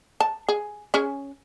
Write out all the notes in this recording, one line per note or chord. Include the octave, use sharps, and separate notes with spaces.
A5
G#4
C#4 G#4